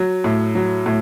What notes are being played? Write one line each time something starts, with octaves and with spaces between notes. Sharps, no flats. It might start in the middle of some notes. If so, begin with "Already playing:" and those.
Already playing: F#3
A2
F#3
A2